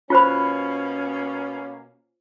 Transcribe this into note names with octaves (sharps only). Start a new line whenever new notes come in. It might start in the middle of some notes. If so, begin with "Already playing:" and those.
B2 A#3 C#4 F4 C5 B5